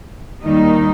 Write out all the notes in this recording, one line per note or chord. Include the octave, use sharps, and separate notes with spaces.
D#2 D#3 G3 D#4